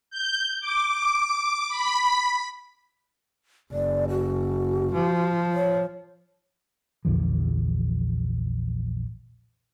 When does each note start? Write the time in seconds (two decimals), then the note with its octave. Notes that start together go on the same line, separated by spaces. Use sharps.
0.10 G6
0.60 D6
1.68 B5
3.72 F#1 D5
4.09 F#4
4.94 F3
5.54 C#5
7.05 A#1 E2 D3 F3